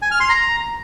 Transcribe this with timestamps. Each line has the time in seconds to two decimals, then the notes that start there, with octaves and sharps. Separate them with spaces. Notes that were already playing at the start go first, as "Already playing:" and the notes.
0.02 G#5
0.11 F6
0.20 C6
0.29 A#5